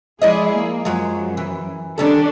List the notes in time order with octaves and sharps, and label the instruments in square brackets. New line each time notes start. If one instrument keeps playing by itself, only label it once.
[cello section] F3 G#3 G#4 [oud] E4 D5 D#5
[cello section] A#3
[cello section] F#2 [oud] F3 F#3 G#3
[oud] E3
[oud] D#3 G3 A4 [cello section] C#4 D4